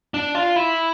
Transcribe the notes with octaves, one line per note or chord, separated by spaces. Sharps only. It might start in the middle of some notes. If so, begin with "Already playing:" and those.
D4
F4
E4